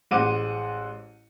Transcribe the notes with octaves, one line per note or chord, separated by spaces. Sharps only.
A1 G#3 C5 F#5 D6 D#7